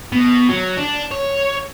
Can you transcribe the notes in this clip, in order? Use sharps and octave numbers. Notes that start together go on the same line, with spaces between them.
B2
F#3
D4
C#5